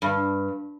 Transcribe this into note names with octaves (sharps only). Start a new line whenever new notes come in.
G2